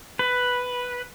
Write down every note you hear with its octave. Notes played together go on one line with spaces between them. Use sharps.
B4